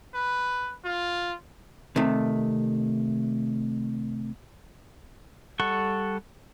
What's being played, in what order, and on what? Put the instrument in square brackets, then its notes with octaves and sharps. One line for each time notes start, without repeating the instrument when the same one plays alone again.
[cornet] B4
F4
[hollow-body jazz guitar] C3 D#3 A3
[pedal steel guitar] G3 A4 F#5 C#6